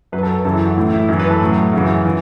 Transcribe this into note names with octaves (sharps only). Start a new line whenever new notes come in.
F#2 F#3 B4
A4
B4
F#2 C#3 E3 A4
E4
F#4
A2 E3 E4
E4
F#2 E3 E4
B4
A4
A2 F#3
F#2 C#3 E3 F#4
E3